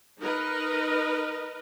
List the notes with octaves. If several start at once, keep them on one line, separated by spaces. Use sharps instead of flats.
D#4 A#4 B4 D#5